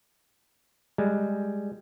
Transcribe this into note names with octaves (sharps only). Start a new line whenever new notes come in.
G3 G#3